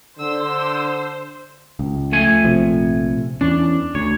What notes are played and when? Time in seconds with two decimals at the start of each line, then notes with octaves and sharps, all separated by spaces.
0.19 D3 C5 E6
1.79 C#2
2.12 F2 A3 G#5
2.45 A#1 C3 F3
3.41 E2 E3 C#4 D4
3.95 D2 C#5